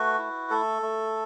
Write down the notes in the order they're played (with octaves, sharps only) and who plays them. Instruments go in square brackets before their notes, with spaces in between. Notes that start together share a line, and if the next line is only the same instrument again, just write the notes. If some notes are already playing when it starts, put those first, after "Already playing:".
Already playing: [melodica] A3 F#4 B4
E4
A3 A4
A3